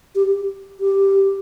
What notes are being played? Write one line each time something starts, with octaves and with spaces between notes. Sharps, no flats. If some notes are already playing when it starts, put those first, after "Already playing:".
G4
G4